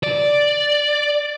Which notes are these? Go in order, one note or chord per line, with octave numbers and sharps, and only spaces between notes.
D5